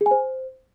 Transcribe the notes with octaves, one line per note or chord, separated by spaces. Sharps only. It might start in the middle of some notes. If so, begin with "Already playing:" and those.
G#4
G#5
C5